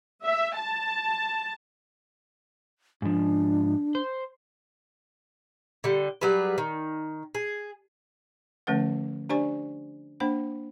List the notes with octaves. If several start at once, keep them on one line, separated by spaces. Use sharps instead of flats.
E5
A5
G#2 F3 D4
C5
D3 G3
F#3 G3 G#4 B4
D#3
G#4
D3 F3 A3 C#4 B4 F#5
D4 G4 C5 D5 G#5 C#6
A#3 D4 C5 G5 B5